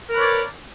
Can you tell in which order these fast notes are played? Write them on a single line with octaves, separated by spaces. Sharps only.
A#4 B4 C#5 D5